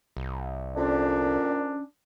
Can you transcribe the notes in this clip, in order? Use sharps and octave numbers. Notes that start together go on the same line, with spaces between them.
C2
F2 A#2 C#4 D4